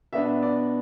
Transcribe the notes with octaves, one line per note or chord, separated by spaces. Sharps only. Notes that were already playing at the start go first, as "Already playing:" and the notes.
B2 B3 D4 E5
D5